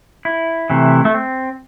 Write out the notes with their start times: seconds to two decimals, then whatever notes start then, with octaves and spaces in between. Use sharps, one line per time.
0.25 E4
0.70 C3 E3 A3
1.05 A3
1.14 C4